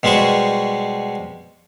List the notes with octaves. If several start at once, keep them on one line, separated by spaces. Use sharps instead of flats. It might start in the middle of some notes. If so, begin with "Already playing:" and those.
B2 G3 G#3 C5 C#6